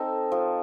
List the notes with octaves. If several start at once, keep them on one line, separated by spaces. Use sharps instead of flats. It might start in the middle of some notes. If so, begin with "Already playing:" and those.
Already playing: C4 D#4 A4
F3